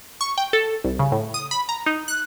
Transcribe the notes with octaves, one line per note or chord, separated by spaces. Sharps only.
C#6
G5
A4
C2
C#3
A2
D#6
B5
A#5
D#4
F#6